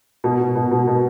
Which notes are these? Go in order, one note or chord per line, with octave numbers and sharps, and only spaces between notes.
B2
B2
B2
B2
B2